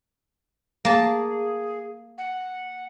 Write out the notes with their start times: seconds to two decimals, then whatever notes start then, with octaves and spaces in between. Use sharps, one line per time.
0.85 A#3 G#4 A5
2.18 F#5